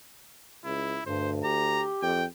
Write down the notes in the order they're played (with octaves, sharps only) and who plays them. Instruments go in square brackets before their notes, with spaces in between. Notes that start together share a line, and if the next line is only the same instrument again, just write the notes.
[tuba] C#2 [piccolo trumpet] E4
[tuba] D2 [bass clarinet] G2 [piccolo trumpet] C5
[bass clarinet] G4 [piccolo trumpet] A#5
[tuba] F2 [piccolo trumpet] G5